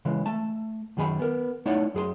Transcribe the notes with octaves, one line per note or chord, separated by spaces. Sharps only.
C#3 E3 G#3
A3 A5
F#2 D#3 G#4 G#5 B5
B3 A#4
A3 D#4 E4 C#5 D5 F#5
F#2 G#4 A#4 C6